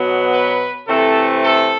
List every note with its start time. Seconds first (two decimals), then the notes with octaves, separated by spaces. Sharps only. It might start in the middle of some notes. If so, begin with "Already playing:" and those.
Already playing: B2 F#3 B3
0.33 B4
0.87 C3 E3 A3 C4 A4
1.42 A4